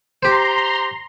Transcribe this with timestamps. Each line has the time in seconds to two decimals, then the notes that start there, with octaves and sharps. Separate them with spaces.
0.23 G4 C5 A#5 C6